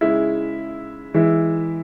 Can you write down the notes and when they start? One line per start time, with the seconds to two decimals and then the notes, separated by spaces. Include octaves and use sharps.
0.01 C#3 G#3 E4
1.14 E3 G#3 E4